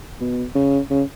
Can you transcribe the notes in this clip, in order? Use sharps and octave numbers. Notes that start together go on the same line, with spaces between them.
B2
C#3
C#3